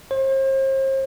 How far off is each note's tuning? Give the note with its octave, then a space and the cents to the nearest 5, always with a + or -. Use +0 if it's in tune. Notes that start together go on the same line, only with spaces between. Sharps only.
C5 +40